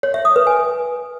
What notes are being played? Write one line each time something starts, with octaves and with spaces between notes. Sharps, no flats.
C#5
E5
D#6
B4
G#5